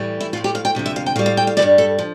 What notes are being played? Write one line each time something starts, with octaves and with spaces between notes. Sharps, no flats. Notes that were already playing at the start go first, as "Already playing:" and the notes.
Already playing: A2 E3 G3
E4
A2 F3 F4
G4
F5
G5
D2 C3 F3
E5
F5
G5
A2 G3 F5
F5
G5
F5
E3 G3 D5
G2
A4
F3